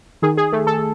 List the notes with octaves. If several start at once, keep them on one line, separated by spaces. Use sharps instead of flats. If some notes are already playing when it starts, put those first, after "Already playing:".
D#3 G#4
G#4
A3
A4